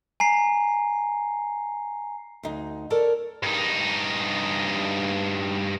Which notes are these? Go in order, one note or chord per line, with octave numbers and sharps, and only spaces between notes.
G#5 A#5 C7
D2 D#4
A4 A#4 C#5 D5 A5
G2 D#4